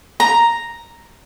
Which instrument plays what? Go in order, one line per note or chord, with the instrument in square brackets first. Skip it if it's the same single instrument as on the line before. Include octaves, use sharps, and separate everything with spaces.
[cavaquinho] A#5